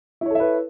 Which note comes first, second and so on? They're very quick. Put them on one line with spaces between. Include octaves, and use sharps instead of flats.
E4 C#5 A4 E5 B4